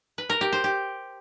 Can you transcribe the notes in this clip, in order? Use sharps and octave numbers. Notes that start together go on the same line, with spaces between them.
B4
A#4
G4
C5
G4